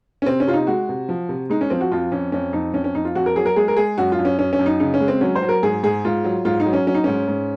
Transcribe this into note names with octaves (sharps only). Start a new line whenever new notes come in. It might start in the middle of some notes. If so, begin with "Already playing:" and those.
C#4
C3 C4
C#4
C3 F4
D#4
G#3 F#4
C3
F3
C3
G#3 D#4
C#4
F3 C4
F#4
F2 F4
F2 C#4
F2 C#4
F2 D#4
F2 C#4
C#4
F2 D#4
F4
F2 F#4
A#4
F#3 G#4
A#4
G#3 G#4
A#4
G#3 G#4
F#2 F#4
F4
F#2
C#4
F#2 C#4
C#4
F#2
D#4
C#3 D#4
C#4
G#3
C4
F#3 C#4
C5
F#3
A#4
G#2 G#4
G#2 G#4
G#2 F4
F#3
G#2 F4
D#4
F#3
C#4
F#3 C#4
D#4
G#2 C#4
G#2